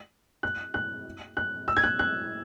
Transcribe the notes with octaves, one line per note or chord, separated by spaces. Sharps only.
F#6
F#6
F#6
E6
G#6
F#6
F#6